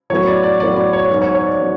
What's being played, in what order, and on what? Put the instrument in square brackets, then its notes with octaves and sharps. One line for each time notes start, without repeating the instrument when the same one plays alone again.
[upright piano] A2 F#3 B3 C#5
D5
D5
A2 F#3 B3 D5
D5
C#5
G#2 F#3 B3
C#5
C#5
D5
F#3 B3